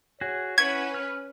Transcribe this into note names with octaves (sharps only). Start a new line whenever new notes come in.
F#4 G#4 C#5
C#4 E4 B4 F#5 C#6 G#6
F6